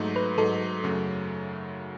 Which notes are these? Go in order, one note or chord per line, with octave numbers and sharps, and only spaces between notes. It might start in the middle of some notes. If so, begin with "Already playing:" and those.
Already playing: G#2 F#3 A3 D#4
B4
G#2 F#3 A3 D#4 A4
F#2 C#3 F#3 A3